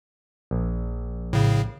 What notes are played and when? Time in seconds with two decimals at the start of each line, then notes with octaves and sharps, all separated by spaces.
0.51 A#1
1.33 A2 C#3